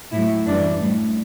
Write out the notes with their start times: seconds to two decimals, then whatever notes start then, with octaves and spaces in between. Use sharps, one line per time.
0.12 A2 F#3 A3 E4
0.46 F#2 E3 G3 D4
0.79 A2 G3